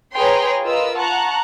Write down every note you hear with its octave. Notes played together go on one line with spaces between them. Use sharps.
G#4 B4 C#5 G5 A#5 C6
F4 A#4 B4 D#5 E6
F#5 A5 A#5 C#6 F#6